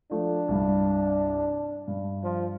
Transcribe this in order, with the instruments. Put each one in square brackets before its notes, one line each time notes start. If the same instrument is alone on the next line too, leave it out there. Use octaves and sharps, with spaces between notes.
[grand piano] F3 A3 [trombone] D4
[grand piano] C2 G2
G2
[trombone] F3